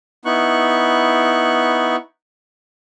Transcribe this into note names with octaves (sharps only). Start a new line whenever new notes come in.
B3 D#4 E4 C#6 F#6